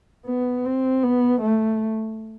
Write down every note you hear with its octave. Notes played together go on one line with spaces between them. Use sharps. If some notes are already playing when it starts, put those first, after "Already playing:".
B3
C4
B3
A3